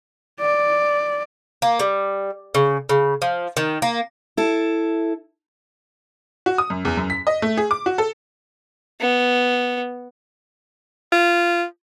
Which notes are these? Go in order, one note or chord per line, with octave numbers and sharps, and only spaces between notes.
D5
A#3
G3
C#3
C#3
F3
D#3
A#3
E4 A4
F#4
D#6
F#2
E2
F#2
B6
D#5
A3
G#4
D6
F#4
A4
B3
F4